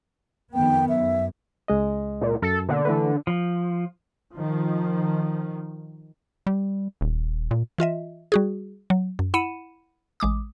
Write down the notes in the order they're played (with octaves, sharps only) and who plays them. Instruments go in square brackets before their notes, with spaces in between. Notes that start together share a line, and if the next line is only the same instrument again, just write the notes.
[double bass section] F2 D#3 B3 [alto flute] G5
[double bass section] F#2 [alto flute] E5
[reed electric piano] C#2 G#3 D#5
[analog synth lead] A#2
[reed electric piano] F#2 [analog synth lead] A4
[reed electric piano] B2 A#3 [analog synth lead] D3
[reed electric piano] E3 A3 B4
[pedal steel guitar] F3
[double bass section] D#3 F3
[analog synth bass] G3
D#1
A#2
[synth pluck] E3 F4 D#5 E5
G3 F#4 G#4
F#3
F#2
E4 F#5 B5 C#7 D#7 E7
A1 G#3 D6 D#6